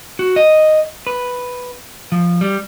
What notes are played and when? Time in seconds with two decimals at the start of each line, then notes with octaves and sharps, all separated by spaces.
0.19 F#4
0.36 D#5
1.07 B4
2.12 F3
2.41 G3